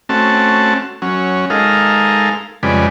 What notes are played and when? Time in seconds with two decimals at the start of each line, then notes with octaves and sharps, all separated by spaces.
0.09 A3 C4 C#4 F#4 A5
1.02 F#3 C#4
1.50 G#3 D#4 A4 A#4 F5
2.63 F2 C#3 G3 G#3 B4 D5